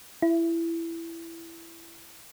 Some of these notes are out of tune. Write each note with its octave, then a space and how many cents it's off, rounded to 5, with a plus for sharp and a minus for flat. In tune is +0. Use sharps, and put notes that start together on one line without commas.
E4 +15